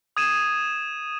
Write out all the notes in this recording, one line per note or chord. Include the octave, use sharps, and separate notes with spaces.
D#6 G#6 D#7 E7